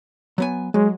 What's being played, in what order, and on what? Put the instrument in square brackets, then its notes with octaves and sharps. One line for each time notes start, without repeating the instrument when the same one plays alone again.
[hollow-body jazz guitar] F#3 B3 G#5
[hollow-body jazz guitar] F#3 [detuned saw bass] G#3